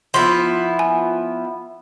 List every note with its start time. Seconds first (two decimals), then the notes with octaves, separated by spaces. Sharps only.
0.14 F3 B3 E4 C6
0.79 G#5